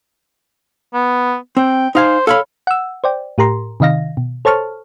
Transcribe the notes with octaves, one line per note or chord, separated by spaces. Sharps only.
B3
C4 G5
D#4 C5 F5 G#5
A4 C#5 F5 B5
F#5 E6
C5 D5 G5
A2 G4 A#4 A#5 C6
C3 D#3 D#5 F5 A#6
B2
A4 C5 C#5 A5 C#6 F6